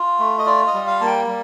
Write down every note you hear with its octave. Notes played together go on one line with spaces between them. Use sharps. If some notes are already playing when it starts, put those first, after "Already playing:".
Already playing: F4
A3
D#5
F4 D5
D#5
G3
F5
A#3 A5
G5
G3